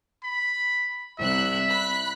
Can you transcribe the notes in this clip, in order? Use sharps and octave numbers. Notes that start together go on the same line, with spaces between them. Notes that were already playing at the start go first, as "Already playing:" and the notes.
B5
C2 E5 F#6
B5 F#6 B6